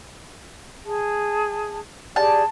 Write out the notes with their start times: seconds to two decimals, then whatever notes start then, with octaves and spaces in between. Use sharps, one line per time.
0.85 G#4 A5
2.16 G4 G#4 D5 A5